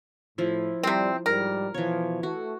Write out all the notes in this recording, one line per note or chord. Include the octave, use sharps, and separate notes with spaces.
A2 F3 E4
C3 G3 C4
G#2 G3 A#4
B2 E3 F3 C#5
A3 F#4